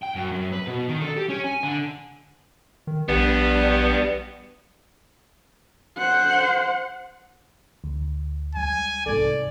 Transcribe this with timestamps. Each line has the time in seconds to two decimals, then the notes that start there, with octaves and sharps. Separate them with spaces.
0.03 G5
0.15 F#2
0.32 F#2
0.52 B4
0.67 B2
0.89 D#3
1.01 A4
1.16 G4
1.29 C#4
1.44 G#5
1.63 D3
2.87 D#3
3.09 A#1 G3 B3 D4
5.98 C5 F#5
7.84 D2
8.55 G3 G#3 G#5
9.06 C2 G#2 A4 D5